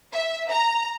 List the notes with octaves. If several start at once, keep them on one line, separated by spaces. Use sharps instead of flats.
E5
A#5